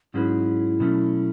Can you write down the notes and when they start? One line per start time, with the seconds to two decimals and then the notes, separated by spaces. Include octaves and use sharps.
0.14 G#2 F#3 C#4 E4 G#4 B4
0.80 B2 F#3 A3 C#4